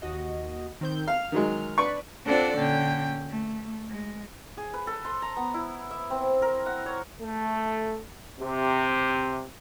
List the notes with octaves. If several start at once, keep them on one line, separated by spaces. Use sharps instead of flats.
D#2 F#4 D#5
D#3 C4 G6
F5 F6
D#3 F#3 G#3
D4 B4 D5 C#6
C4 D4 F4 A4 D5 F#5
A#2 D3 C#4 G5
A3
G#3
G#4
B4
A4
C6
A#5
B3
E4
E5
C4
A#4
F#5
C#5
A3
C3